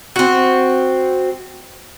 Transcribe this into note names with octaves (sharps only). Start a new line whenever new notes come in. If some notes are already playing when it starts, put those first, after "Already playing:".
C4 F#4